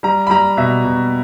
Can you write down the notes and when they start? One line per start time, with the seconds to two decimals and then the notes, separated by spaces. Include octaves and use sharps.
0.03 G3 A#5
0.27 B5
0.30 G3 A#5
0.57 B2 E5
0.84 B2